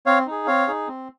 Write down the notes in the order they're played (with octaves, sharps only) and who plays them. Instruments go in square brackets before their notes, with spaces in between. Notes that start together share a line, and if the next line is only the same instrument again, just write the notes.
[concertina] C4 C#5 F5
D#4 G#4
C4 C#5 F5
D#4 G#4
C4